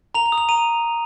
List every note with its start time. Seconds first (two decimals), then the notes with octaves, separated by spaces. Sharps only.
0.14 A#5 F7
0.26 F7
0.32 D#6
0.38 F7
0.49 A#5 D#7